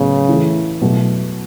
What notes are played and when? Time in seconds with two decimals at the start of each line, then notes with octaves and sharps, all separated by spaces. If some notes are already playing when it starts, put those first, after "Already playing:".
Already playing: A2 C#3 F#3 B3 E4
0.29 E3 A3 E4
0.81 B2 F#3 A3